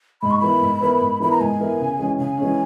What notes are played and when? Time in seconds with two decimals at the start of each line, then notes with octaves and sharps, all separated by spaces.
0.22 G#2 B5
0.31 C#6
0.39 E3 B3 E4 A#4 B5
0.62 G#2
0.81 E3 B3 E4 A#4
1.00 G#2
1.20 E3 B3 E4 A#4 B5
1.31 A#5
1.40 G#2 G#5
1.60 E3 B3 E4 A#4
1.80 C#3
1.99 E3 G#3 C#4
2.19 C#3 G#5
2.38 E3 G#3 C#4